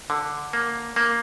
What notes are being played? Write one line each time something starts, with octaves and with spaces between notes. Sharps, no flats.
D3
A#3
A#3